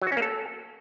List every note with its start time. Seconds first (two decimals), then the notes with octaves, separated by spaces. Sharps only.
0.02 F#3
0.07 F#4
0.12 C#4
0.17 A#3
0.22 A4